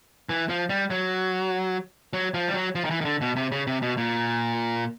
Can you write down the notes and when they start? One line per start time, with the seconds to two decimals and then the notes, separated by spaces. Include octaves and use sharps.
0.29 E3
0.49 F3
0.70 G3
0.90 F#3
2.13 F#3
2.34 F3
2.48 G3
2.54 F#3
2.75 F3
2.85 D#3
2.91 E3
3.01 D#3
3.05 D3
3.21 B2
3.36 C3
3.52 C#3
3.67 C3
3.82 B2
3.97 A#2